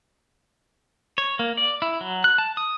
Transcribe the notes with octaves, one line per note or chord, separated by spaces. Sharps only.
C#5
A#3
D5
E4
F#3
F#6
A5
D#6